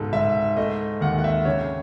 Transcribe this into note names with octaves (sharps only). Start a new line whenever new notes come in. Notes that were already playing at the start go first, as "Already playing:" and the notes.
Already playing: C#2 G#2 B2 A4
G#2 E5
A3 D#5
D#2 F#5
F#5
E5
C#3 C#5